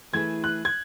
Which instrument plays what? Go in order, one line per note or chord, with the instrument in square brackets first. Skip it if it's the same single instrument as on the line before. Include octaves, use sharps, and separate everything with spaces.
[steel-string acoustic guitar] E3 A3 E4 G#4 B4 [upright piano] G#6
[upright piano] F#6
G#6